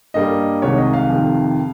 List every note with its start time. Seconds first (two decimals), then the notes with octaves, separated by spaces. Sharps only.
0.14 G2 G3 A#3 D#5
0.62 C2 C3 D#3 G#3 C#5
0.78 D#5
0.93 F5
1.10 F2 C3 D#3